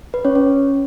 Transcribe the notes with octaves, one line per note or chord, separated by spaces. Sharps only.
B4
C#4 C#5
C#4 C#5